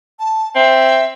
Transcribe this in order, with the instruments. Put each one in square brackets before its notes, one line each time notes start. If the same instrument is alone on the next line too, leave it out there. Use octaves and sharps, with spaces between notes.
[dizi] A5
[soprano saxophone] C4 [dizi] E5